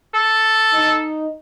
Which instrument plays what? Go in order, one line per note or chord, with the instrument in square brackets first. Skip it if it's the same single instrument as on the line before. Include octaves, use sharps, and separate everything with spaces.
[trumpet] A4
[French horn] D#4